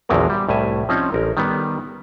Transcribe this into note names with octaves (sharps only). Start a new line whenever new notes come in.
A#1 E2 D3 F3 F#3 A#4
G3
C2 A2 E5 G#5
F3 C4 C#4 D#4
A1 A#4
D#3 G3 B3